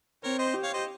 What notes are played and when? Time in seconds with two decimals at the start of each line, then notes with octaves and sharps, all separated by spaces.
0.23 C4 A#4 C#5
0.39 C5 D#5
0.53 G4
0.63 C#5 F5
0.73 C5 D#5